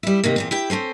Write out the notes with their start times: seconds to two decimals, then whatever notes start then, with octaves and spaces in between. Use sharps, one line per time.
0.03 G3 E4
0.24 C3 D#3 A#3
0.36 E2 A#2 C4
0.51 E4 G4 G5
0.70 C4 C#4 A4 C5